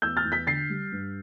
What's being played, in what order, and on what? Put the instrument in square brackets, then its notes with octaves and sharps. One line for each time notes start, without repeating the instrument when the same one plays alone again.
[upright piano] E2 E6 G6
F6 A6
E2
G6 B6
D3 A6 C7
G3
G2